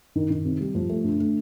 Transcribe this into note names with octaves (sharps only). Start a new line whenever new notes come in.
D#3
D#3
C3
G3
F3
A3
D3
A3